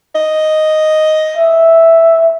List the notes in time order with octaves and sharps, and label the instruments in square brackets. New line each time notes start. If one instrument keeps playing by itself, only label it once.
[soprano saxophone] D#5
[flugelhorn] E5